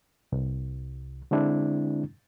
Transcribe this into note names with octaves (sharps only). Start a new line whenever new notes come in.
C2
D3 G#3 C4 D4 E4